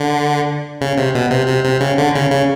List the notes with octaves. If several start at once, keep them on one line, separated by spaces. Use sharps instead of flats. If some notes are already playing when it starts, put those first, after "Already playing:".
Already playing: D3
C#3
C3
B2
C3
C3
C3
C#3
D3
C#3
C#3